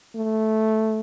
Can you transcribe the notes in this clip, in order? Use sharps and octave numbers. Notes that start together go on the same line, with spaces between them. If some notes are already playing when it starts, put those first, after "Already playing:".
A3